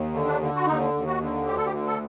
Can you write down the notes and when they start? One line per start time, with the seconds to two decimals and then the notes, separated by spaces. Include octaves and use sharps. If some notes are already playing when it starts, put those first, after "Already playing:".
Already playing: D#2
0.14 D3
0.27 D4
0.41 D3
0.56 F#4
0.66 D#2 D#4
0.94 D#2
1.07 F#4
1.20 D3
1.47 D2 G4
1.57 A4
1.66 G4
1.73 D3
1.87 A4